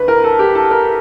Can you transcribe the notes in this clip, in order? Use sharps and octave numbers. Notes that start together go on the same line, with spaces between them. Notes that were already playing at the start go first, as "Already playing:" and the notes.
Already playing: D2 B4
A#4
A4
G4
A4
A#4